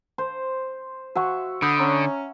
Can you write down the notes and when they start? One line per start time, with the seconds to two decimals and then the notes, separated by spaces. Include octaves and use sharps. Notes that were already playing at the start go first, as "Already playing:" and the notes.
0.18 C5
1.16 F#4 E5 F#5 C#6
1.62 D3 B5 D#6 G6
1.80 C#4 A#5